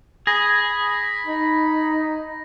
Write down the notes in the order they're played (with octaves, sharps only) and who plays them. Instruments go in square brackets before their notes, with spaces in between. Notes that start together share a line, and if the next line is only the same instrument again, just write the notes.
[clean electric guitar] G#4 [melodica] B5 [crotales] A#6
[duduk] D#4